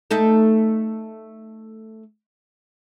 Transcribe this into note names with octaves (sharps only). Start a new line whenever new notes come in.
A3 D#4 A4